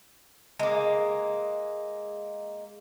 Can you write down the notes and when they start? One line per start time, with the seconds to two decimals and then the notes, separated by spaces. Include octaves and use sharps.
0.59 G#3 A#3